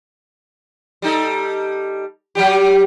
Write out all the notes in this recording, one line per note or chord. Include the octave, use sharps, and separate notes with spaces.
G3 D#4 A4
F#3 G3 G4